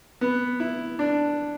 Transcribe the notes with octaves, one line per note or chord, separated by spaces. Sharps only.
B3
E4
D4